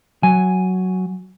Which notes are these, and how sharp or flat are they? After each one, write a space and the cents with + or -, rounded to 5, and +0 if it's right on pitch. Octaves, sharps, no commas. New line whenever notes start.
F#3 +0 G#5 +0